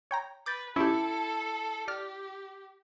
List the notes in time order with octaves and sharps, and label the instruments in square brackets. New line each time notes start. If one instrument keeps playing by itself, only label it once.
[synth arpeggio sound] C#5 G5 A#5
[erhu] B4 [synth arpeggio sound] D6 G6 A6
[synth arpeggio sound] C#4 G4 [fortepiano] E4 [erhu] A4
[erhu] G4 [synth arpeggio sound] D5 F6